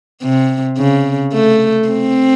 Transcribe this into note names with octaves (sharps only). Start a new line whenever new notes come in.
C3
C#3
A3
C4